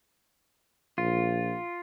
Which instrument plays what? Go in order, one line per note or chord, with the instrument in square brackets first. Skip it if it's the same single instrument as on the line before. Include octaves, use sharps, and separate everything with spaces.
[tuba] A#1 [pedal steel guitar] F4